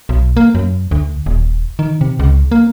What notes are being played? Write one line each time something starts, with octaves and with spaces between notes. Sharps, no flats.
B1
A#3
F#2
D2
D#1
D#3
C3
C#2
A#3